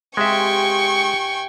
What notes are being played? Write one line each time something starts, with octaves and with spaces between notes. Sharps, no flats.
C3 G#3 F4 E5 G5 G#5 C#6